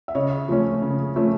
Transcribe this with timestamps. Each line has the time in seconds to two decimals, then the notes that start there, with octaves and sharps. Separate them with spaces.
0.08 E5
0.15 C#3 C#5 D#5
0.48 F3 A3 C#4
0.82 C#3
1.16 F3 A3 C#4